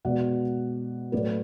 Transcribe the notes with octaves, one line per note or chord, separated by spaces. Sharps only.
B2 G#3 B3 D5 F#5
A2 F#3 A3 B4 D5